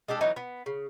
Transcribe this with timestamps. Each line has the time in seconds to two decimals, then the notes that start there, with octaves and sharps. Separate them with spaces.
0.08 G#3 D4 G4 A4
0.21 E3 F#3 B3 D#4
0.36 B3
0.66 C#3